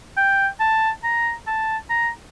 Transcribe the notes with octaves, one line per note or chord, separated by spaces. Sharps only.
G5
A5
A#5
A5
A#5